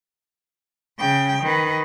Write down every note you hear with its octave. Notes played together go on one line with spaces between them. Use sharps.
C#3 G5
D#3 B4